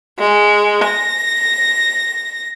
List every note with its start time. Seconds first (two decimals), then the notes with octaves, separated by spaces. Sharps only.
0.18 G#3
0.85 A#6